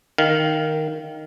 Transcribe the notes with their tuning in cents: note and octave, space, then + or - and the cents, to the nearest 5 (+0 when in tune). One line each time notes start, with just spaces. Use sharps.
D#3 -5 F5 +0